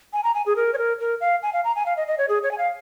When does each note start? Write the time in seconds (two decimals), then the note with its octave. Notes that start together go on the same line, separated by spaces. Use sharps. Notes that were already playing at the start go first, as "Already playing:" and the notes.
0.13 G#5
0.24 A#5
0.35 G#5
0.46 G#4
0.56 A#4
0.74 C#5
0.78 A#4
1.00 A#4
1.21 F5
1.43 G#5
1.53 F5
1.64 A#5
1.76 G#5
1.86 F5
1.97 D#5
2.07 D#5
2.18 C#5
2.29 G#4
2.43 C#5
2.51 G#5
2.58 F5